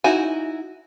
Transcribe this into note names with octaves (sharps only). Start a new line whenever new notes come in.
D#4 E4 F#4 G#5